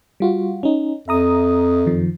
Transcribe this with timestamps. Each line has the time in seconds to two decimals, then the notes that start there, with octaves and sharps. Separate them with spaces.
0.20 G3 F4 F#4
0.63 C#4 D#4
1.08 F2 E5 A#5 D#6
1.86 F#2 D#3 F3